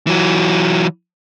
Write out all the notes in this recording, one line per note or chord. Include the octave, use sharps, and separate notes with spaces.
E3 F#3